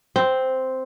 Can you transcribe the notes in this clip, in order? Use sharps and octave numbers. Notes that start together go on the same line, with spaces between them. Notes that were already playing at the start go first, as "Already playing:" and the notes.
C4